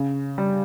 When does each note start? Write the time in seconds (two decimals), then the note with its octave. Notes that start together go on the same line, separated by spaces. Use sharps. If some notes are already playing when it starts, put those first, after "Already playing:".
Already playing: C#3
0.38 G3